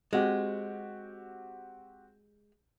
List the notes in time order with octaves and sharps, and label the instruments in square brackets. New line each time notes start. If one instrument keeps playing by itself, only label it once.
[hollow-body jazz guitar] G#3 [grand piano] C4 F#4 G4